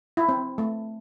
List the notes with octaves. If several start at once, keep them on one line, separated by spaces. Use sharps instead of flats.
E4
C4
A3